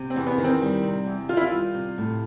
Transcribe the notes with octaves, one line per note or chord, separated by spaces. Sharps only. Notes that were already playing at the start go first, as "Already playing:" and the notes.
Already playing: C3
C4
E2
B3
D#3
C4
G3
C3
E2
D#3 F4
E4
F4
G3
C3
A2